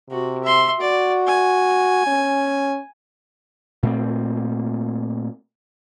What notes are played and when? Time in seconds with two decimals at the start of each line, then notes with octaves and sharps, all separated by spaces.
0.10 C3 F#4
0.43 E5 C6
0.80 F#4 D5
1.27 G#5
2.07 C#4
3.83 A#2 A3 C4